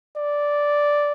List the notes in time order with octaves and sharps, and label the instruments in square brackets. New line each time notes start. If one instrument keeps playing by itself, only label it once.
[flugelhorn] D5